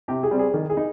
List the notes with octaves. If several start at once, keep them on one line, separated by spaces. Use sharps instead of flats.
C3 G4
G#4
G3 C4
G#4
D#3 G#4
G#4
D#4